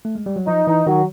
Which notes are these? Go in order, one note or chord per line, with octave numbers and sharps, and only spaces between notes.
A3
G#3
G3
F#3
F3 D#4
E3 D#4
D#3 F#3